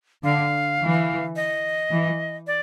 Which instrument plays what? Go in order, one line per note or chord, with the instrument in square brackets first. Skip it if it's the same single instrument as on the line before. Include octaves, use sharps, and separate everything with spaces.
[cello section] D3 [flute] F5
[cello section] E3
[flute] D#5
[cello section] E3
[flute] D5